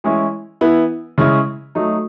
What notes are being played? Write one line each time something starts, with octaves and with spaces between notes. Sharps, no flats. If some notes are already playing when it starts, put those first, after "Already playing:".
E3 G#3 C#4 E4
E3 B3 E4
C#3 G#3 C#4 E4
F#3 A3 D#4